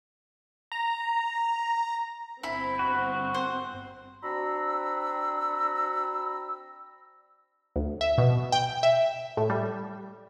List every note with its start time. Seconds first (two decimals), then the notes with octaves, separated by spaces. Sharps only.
0.72 A#5
2.43 G1 C4 E4 B5
2.79 F#4
3.34 C5
4.23 C4 D4 F#4 A#5 B5 E6
7.76 D2
8.01 E5
8.18 B2
8.52 G5
8.83 E5
9.37 A2
9.50 G3